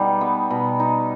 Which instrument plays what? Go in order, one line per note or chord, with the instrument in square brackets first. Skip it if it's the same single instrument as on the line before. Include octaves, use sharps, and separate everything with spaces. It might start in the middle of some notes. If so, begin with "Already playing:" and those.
Already playing: [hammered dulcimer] B2 G3 D#4 [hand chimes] G5
[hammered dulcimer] B3
B2
D#4